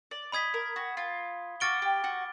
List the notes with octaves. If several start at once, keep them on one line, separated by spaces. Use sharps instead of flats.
D5
D#5 B5 D#6 G#6 B6
A#4
F#4
F4
F#4 D6 F6 A6 D7 G7
G4
F#4